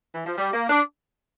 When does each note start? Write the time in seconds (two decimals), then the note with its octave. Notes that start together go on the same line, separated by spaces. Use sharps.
0.15 E3
0.26 F3
0.38 G3
0.54 A#3
0.69 D4